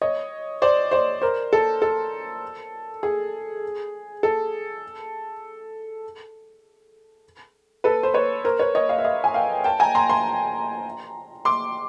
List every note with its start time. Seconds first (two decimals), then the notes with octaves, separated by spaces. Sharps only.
0.02 C#5 D#5
0.62 C5 D5
0.91 C5 D5
1.22 A#4 C5
1.53 A4
1.82 A4
3.03 G#4
4.23 A4
7.84 A4 B4
8.03 C5
8.14 B4 C#5
8.44 A#4 C5
8.59 B4 C#5
8.75 C#5 D#5
8.89 D#5 F5
8.98 E5
9.04 D#5 F5
9.24 G#5
9.34 F5 G5
9.64 G5 A5
9.80 G#5 A#5
9.95 A#5 C6
10.09 A#5 C6
11.45 C6 D6